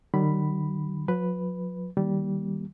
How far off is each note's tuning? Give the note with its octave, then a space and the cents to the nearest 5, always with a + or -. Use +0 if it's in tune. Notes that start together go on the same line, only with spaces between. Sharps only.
D#3 -45 F#3 +45 B5 +0
F#3 -45 B4 +0
D#3 +0 G3 -15 A#3 +15